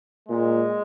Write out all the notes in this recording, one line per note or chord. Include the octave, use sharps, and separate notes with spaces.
A#2 G#3